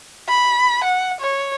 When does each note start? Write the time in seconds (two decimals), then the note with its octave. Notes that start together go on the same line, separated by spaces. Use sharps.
0.29 B5
0.84 F#5
1.20 C#5